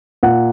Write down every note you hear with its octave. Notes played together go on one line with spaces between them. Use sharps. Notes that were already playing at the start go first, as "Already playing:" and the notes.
A#2 F#5